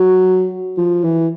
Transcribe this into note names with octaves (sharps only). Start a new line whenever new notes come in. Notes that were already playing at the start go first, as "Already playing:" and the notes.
Already playing: F#3
F3
E3